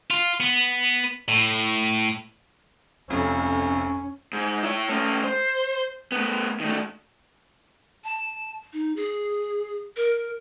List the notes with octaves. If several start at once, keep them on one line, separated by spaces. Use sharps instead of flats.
F4
B3
A2
F1 F2 C#4
G#2
E4 C#5
A3 C#4
C5
A3 B3
D#3 A3
A5
D#4
G#4
A#4